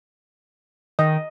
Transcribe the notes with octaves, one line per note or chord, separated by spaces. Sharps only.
D#3 D#5